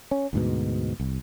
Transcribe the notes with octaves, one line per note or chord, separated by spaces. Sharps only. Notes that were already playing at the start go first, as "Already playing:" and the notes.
C#4
D2 G#2 B2
C2